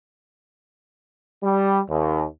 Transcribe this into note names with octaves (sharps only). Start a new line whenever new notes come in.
G3
D#2